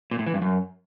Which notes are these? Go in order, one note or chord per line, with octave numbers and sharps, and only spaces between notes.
A#2
A2
E3
G2
F#2